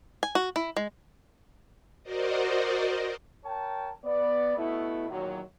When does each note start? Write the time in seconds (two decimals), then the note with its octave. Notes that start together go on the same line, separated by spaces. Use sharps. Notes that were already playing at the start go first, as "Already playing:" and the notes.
0.23 G#5
0.35 F#4
0.56 E4
0.77 G#3
2.03 F#4 A#4 C5 D5 D#5
3.44 A#4 C#5 G5 A5
4.04 B3 D5
4.57 B2 A3 B3 E4
5.09 E2 A#2 D#3 F#3